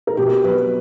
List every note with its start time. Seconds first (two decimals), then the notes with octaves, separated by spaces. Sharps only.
0.07 A#4
0.17 B2 G4
0.44 F#3 B4